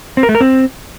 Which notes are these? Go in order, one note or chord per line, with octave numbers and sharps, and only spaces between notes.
C4
A#4
A3
A#4
C4